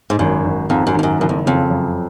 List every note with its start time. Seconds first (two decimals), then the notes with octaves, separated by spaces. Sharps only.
0.10 G#2
0.19 G#1 F#2
0.45 G#1
0.70 F2 G#2
0.87 F#2
0.95 F2 D#3
1.03 F#2
1.20 F#1 F#2
1.29 F2
1.45 F2 C#3
1.70 F#2